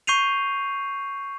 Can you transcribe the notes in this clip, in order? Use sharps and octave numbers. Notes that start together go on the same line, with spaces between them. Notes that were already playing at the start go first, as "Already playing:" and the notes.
C#6 G6 C7 D#7 F7